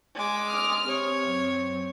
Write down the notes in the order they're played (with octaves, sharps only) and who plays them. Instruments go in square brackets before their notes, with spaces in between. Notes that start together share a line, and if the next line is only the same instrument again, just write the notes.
[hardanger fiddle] G#3 D6
[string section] D#6 F6
[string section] C3 [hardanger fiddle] C#5
[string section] F#2 C4